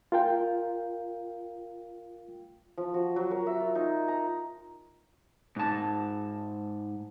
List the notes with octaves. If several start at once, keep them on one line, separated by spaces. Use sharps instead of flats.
F4 A#4 F5 G5
F3
F#4
F#3
A#4
E5
F4
D#4
A#5
G#2 A5